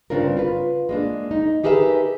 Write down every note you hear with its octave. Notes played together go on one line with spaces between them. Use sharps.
G2 C#3 C4 D4 F4 A#4
F4 B4
G#3 A#3 D4
D#4
D#4 G4 G#4 A#4 B4 E5